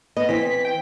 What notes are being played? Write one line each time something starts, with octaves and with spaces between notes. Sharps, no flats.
B3 D#5
E3 C4 B6
G5